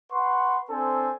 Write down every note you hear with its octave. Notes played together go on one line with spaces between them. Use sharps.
B4 F#5 C6 C#6
C4 D4 A4 C5 G#5